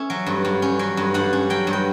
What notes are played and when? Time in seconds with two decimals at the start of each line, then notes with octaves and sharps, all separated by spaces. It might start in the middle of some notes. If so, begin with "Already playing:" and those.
Already playing: C#4 E5
0.10 F#3
0.26 G2
0.45 G2
0.62 C#4
0.79 F#3
0.97 G2
1.14 G2 F#5
1.33 C#4
1.50 F#3 G5
1.67 G2
1.73 G5